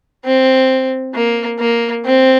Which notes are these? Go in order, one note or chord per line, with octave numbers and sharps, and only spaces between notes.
C4
A#3
A#3
C4